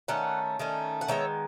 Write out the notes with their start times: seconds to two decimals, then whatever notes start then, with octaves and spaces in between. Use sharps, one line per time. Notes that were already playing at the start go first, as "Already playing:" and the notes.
0.08 D#3 A3 C#4 F#5
0.59 D#3 A3 C#4
1.01 F#5
1.08 D#3 G#3 B3 C#5 E5